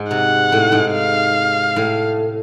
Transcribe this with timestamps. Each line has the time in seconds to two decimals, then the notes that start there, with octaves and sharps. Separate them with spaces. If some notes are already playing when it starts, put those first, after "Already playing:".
Already playing: G#2
0.10 C3 F#5
0.52 A2
0.72 G#2
0.93 F5
1.76 A2